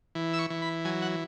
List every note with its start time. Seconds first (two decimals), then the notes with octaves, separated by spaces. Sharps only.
0.15 E3
0.33 E6
0.39 C#6
0.50 E3
0.62 B5
0.85 F#3 G#5
1.02 F#5